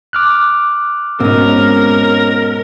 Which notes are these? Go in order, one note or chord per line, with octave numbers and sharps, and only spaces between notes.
D6 F6 F#6
G#2 B2 C4 C#4 A#4